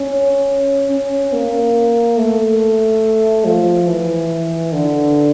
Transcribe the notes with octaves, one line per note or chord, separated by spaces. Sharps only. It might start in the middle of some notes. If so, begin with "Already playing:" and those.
Already playing: C#4
C#4
A#3
A3
F3
E3
D3